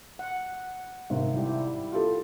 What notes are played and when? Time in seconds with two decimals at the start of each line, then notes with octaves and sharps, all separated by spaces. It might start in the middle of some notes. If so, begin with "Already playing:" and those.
0.19 F#5
1.10 G#1 C3
1.34 G3 E4 G4
1.92 F4 G4 A4